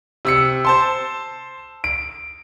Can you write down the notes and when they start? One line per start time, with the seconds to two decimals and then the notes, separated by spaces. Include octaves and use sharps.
0.25 C3 E6 C#7
0.65 C5 A5 C6
1.84 D7